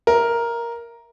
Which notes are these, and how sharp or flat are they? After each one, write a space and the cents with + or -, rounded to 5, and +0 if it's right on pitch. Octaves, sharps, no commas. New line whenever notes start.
A#4 +5 E5 +0